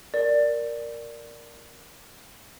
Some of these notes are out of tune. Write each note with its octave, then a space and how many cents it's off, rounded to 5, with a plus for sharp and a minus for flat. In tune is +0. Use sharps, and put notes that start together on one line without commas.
A#4 +0 D5 +0